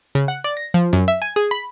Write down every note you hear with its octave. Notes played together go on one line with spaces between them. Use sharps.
C#3
F#5
D5
A#6
F3
F#2
E5
G#5
G#4
B5